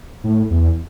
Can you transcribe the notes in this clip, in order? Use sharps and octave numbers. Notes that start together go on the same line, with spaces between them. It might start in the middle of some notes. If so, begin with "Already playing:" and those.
A2
E2